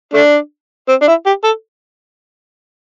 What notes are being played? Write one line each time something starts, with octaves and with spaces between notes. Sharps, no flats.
A3 D4
C4
D4
E4
G4
A4